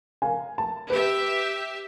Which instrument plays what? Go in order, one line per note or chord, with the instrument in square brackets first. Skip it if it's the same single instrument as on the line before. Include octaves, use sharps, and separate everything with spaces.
[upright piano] A#4 F5 G#5
A5
[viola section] G4 E5 [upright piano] B4